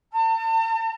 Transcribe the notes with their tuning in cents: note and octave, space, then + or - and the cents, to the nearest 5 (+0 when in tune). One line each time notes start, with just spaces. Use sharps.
A5 +40